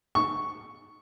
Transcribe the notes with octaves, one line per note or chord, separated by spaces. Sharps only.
C#6